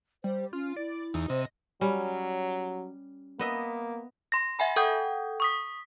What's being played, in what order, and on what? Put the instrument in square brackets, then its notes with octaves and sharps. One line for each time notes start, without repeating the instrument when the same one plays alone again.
[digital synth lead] G3 [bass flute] C5
[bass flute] C#4 [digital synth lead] F4
[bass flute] E4 [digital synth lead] D5
[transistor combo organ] E2 [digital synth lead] D#4
[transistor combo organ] C3 [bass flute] C5 [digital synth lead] D#5
[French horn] F#3 [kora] G3 C#4
[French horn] A#3 [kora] B3 D#5 E5
[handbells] C6 A#6
E5 F#5 G#5 B5
A4 F#5 G5 D#6 G6 G#6
C#6 D#6 B6